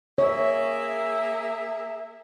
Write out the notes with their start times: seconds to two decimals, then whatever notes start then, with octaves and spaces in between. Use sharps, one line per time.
0.18 A#3 G#4 C#5 E5